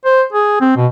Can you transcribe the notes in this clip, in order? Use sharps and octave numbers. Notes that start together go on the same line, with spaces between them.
C5
G#4
C4
B2